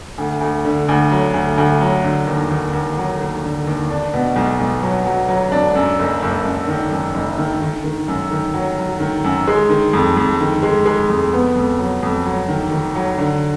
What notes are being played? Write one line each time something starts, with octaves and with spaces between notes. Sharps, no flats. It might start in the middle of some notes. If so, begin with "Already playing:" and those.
D2
D2
D3
D2
F#3
D2
D2
F#3
D3
D#2
D#2
D#2
F#3
D#2
D3
D#2
D4
B2
B1
B1
F#3
F#3
F#3
D4
F#2
F#1
F#1
F#2
D#3
F#2
F#1
D#3
D#3
D#3
F#2
D#3
F#3
F#3
D#3
F#2
G#3
D#3
F2
F2
D#3
G#3
G#3
F2
B3
F2
F#3
F2
F#3
D#3
D#3
F#3
D3